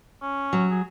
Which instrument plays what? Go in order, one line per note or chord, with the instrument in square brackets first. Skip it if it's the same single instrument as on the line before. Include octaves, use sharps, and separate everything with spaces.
[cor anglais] C#4
[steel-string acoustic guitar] F#3
[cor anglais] G#4